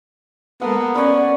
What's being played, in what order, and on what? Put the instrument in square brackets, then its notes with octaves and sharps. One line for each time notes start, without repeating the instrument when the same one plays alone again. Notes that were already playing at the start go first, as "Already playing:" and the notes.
[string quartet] G#3 A#3 A4 [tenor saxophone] B3 [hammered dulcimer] F#5
[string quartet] C#4 [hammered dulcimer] B4 C#5 [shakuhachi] D5